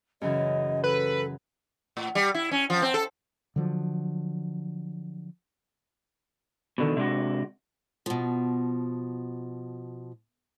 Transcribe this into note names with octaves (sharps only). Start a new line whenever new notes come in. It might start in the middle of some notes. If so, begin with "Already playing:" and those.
F#2 C#3 E3 D#5
A4 B4
A2
G3
E4
C#4
F3
C4
A4
D3 F3 F#3
B2 D3 D#3
C3 G#3 D4 F#4
B2 F3